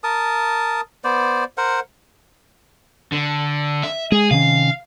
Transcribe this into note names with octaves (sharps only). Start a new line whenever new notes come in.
A#4 A5 D#6
B3 C5 D5
A#4 C5 F#5
D3
E5
G#3 G#4
C3 D#3 C#4 F5